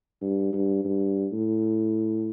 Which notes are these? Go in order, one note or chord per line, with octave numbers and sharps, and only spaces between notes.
G2
G2
G2
A2